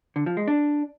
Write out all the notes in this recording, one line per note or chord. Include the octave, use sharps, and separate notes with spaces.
D3
F3
G#3
D4